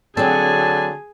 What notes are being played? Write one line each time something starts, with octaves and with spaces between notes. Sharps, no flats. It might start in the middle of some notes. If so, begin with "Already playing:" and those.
D3 F#3 C4 G#4 G#5 A5